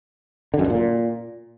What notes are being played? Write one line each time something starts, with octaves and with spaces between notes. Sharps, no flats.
D3
F#2
D3
A#2